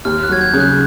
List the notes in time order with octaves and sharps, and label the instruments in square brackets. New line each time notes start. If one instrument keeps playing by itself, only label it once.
[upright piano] D#2 [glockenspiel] F6
[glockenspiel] F#6
[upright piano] F#3 [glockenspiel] G#6
[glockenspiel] G6
[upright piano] C#3
[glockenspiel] F#6